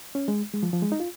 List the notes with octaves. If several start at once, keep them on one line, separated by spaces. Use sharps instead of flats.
C#4
G#3
G#3
F3
F3
G#3
D#4
F4